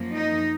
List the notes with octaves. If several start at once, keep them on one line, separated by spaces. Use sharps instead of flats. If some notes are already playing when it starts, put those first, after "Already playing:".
Already playing: F#2 F3 A#3
D#4